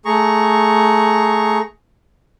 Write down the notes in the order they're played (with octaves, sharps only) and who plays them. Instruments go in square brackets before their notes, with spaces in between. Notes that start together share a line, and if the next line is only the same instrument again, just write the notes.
[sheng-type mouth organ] A3 G#4 A#5 C#6